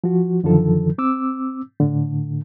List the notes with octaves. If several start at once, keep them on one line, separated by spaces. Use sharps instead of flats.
F3 F#4
F#2 D3 D#3 F3 A4
C4 D6 E6
A2 D3